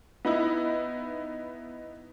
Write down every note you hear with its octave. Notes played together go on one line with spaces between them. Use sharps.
B3 D#4 E4